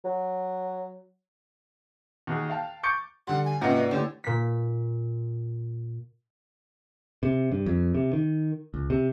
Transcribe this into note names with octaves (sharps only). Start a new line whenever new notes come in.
F#3
D#2 F#4 G#4
F5 G5 A5
C#6 D6 G6 A6 C#7 D7
D3 G3 F#5 C6
G#5
G#2 C3 A#3 C#4 F4 F#4 B4 D#5
B4 D5
D3 A3 E4 G4 C#5 D5
A#2 B6
C3
G2
F2
C3
D#3
C#2
C3